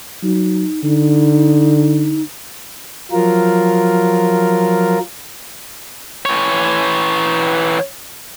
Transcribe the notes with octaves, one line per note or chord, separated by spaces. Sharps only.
F#3 D#4
D3 D#4
F3 F#3 F4 A#4
E3 C#5